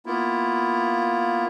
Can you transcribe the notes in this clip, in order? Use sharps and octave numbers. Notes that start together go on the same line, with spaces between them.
A#3 B3 E4 F4